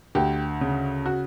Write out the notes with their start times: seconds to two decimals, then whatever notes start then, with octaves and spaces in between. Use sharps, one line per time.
0.15 D2 G4
0.61 C#3
1.06 F#4